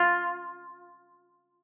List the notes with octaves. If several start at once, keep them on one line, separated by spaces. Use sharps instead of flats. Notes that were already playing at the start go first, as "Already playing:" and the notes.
Already playing: F4